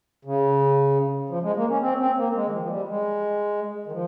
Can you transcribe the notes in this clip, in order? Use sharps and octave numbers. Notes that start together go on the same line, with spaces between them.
C#3
F3
G#3
A#3
C#4
C4
C4
A#3
G#3
D#3
F3
F3
G3
G#3
D#3
F3